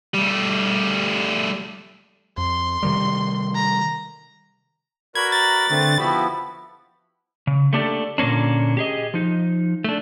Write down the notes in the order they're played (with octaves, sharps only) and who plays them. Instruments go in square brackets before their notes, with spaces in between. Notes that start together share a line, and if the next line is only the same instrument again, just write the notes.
[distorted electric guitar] G3 A3
[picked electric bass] F2 [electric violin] C6
[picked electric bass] C3 D#3 G3
[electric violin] A#5
[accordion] F#4 A#4 B5 [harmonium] B4 D5 [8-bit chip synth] G#6
[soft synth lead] A#5 [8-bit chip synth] A6
[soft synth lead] D3 [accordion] A3 C4
[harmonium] F3 B3 E4 [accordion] F#4 G4 [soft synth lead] B5
[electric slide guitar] C#3
A3 A#3 D4 G4 A4 D5
A#2 D3 A#3 C#4 D4
G4 G#4 D#5
F3 D#4
A3 D4